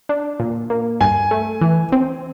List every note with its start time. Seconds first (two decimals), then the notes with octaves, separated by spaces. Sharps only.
0.09 D4
0.40 A#2
0.70 A#3
1.01 G2 G#5
1.31 A3
1.61 E3
1.92 C4